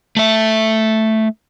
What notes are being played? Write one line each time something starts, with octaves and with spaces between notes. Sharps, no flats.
A3 E5